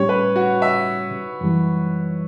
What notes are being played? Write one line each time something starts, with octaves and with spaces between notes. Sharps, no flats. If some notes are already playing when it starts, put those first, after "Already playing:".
Already playing: A2 G3 C#4 G4 C#5
B4
F#4
E5
F#2 E3 G3